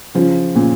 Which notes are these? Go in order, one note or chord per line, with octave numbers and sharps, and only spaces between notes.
C#3 F3
A#2 C#3